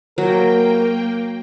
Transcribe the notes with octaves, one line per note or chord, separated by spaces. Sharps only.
F#3 A#3 A#4 G5